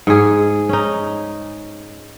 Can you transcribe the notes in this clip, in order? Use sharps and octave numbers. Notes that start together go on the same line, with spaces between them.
G#2 G#4
C#4 D#4